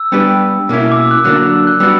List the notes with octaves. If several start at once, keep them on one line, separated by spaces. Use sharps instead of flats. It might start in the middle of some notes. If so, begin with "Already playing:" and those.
Already playing: E6
G3 B3 D4 G4 B4
B2 A#3 C#4 E4
D6
E6
F#6
D3 F#3 A#3 D4 F#6
E6
F#6
G3 B3 D4 F#4 E6